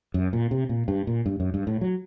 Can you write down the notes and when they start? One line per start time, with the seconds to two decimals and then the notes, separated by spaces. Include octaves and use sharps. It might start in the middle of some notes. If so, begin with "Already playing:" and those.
0.14 F#2
0.33 A#2
0.51 C3
0.69 A#2
0.88 G2
1.07 A#2
1.26 G2
1.40 F#2
1.54 G2
1.67 A2
1.81 F#3